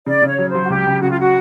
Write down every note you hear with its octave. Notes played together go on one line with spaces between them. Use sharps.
C#3 D5
C#3
C#5
F#3
F#3 C5
F#4
C#2 G4
C#2
C#3 F#4
F4
F#4